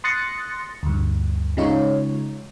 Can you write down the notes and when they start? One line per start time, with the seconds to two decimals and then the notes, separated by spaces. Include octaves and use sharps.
0.04 C6 D#6 F#6 A6 A#6 C#7
0.83 D2 G2
1.57 C#3 G#3 D#4 F4 C#5